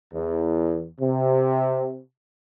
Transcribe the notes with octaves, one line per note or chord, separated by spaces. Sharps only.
E2
C3